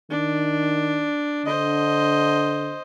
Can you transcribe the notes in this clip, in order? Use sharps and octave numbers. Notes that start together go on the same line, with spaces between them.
D#3 D4
D3 C5 D#5